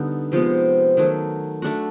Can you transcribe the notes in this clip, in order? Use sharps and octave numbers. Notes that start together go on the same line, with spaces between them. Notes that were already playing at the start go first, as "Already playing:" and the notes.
Already playing: D3 G3 B3 D#4
C3 F3 G#3 B3
D#3 F#3 A3
A3 D4 F#4